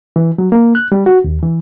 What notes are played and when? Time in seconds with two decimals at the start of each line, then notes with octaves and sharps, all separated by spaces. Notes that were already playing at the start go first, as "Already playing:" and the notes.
0.16 E3
0.38 F#3
0.52 A#3
0.75 F#6
0.92 G3
1.06 F#4
1.24 D#2
1.42 E3